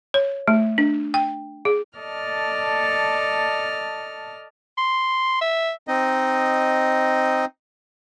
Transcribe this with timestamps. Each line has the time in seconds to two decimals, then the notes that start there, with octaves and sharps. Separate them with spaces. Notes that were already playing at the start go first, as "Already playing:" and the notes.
0.14 C#5
0.48 A3
0.78 D4
1.14 G5
1.65 G#4
1.98 A4 D5 D#5 A5 F6
4.77 C6
5.41 E5
5.88 C4 D#4 D#5